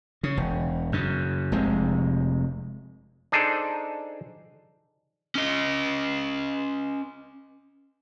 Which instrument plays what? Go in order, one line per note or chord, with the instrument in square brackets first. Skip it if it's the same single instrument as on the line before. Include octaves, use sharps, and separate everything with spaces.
[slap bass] C#3
E1
F#2 C#3
F1 C3 G#3
[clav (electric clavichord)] D4 D#4 G#4 A4 C5
[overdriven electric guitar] C#4 D#5